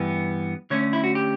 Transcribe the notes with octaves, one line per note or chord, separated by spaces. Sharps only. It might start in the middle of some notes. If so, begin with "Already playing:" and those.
Already playing: G2 E3 B3
D3 A3 C#4 C#5
E4
F#4
G4